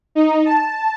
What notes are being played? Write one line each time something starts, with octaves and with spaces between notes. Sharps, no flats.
D#4
A5